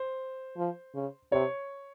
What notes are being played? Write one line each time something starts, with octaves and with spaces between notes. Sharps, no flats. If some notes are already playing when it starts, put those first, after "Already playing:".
Already playing: C5
F3
C#3
C3 C#5